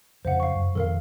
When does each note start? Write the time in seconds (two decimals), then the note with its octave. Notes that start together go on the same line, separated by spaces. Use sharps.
0.25 F2 C#3 F3 C5 F5 F#5
0.40 F5 C#6
0.55 F#2
0.75 F2 B2 D#3 A4 A#4 F5